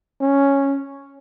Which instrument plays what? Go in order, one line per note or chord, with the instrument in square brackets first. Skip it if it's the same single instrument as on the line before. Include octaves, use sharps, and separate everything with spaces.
[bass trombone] C#4